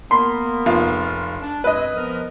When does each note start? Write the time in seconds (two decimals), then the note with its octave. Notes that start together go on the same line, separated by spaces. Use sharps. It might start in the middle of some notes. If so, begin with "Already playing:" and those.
0.11 A#3 B3 A#4 B5 C6
0.66 F1 F4 F5
1.41 D4
1.64 G2 G#3 C4 B4 D#5
1.95 F3 B3 A#4